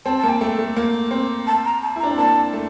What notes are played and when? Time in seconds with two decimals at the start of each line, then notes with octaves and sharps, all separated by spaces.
0.05 C4 A5
0.18 A5
0.23 A#3
0.29 G5
0.41 A3
0.59 A3
0.76 A#3
1.11 C4
1.47 A5
1.65 A#5
1.82 A5
1.96 E4
2.00 A#5
2.03 D4
2.10 C4
2.17 A#3 A5
2.53 A3